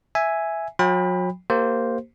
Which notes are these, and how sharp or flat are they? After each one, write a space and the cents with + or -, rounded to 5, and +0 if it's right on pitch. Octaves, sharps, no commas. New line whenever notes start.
E5 +0 G#5 +0
F#3 -35 G5 +35 B5 +0
A#3 -10 G4 -25 C5 +0